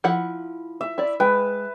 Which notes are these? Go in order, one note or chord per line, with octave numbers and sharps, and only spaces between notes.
F3 E4 F#5
E5
E4 D5
G#3 B4 G5